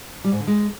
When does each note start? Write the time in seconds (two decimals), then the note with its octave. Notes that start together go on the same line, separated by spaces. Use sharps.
0.24 G3
0.32 G#2
0.40 D3
0.47 G#3